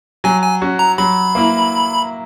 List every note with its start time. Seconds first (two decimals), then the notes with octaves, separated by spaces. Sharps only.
0.24 F#3 G#5
0.43 G#5
0.62 C#4 F#4
0.79 A#5
0.98 F#3 B5
1.35 A#3 E4